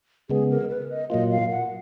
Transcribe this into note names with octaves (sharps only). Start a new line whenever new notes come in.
C#3 G#3 B3 G#4
A#4
B4
D#5
A#2 F#3 A#3 F4 D#5
F5
F#5